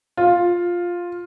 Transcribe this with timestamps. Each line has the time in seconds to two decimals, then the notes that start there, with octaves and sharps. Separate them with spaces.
0.17 F4